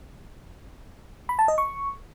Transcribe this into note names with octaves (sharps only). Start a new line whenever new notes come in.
B5
A5
D#5
C#6